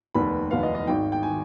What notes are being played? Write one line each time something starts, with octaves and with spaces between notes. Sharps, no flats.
F1 D#2 D#3 B3 B5
F1 D#2 D#3 B3 F5
D#5
D#5
G#1 G#2 D#3 G5
G5
D#3 G#5